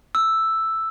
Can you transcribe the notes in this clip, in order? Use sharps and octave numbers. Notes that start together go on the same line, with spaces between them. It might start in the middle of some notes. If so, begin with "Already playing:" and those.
E6